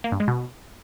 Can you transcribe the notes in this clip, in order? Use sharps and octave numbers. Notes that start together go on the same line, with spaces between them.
A#3
G2
G#3
B2